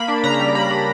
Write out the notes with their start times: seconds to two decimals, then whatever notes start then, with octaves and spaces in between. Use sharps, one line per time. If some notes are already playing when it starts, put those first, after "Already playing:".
Already playing: A#3 B5
0.08 D4
0.24 C#3 A#5
0.34 A#5
0.40 G3
0.55 A#3 B5
0.71 D4